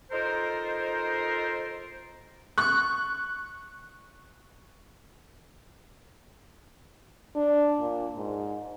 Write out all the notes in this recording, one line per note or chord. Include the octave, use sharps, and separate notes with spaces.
D#4 F4 A4 A#4 C5
C#6 F#6
D4
A#2
G#2